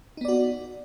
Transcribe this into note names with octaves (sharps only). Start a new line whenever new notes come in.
B3 D#4 F#4 D5